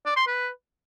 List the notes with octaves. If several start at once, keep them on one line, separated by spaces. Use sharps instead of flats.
D5
C6
B4